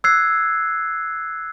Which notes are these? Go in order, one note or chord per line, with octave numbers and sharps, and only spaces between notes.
E6 F#6 G#6 C7